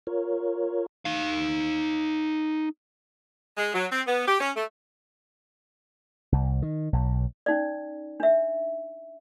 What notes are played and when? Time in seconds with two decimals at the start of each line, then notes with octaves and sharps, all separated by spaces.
0.07 F4 A#4 C#5
1.05 D#4 F5
3.57 G#3
3.74 F#3
3.92 C4
4.07 B3
4.28 G4
4.41 C#4
4.56 A3
6.32 C2
6.62 D#3
6.93 B1
7.46 C#4 D#4 D5
8.20 D4 E5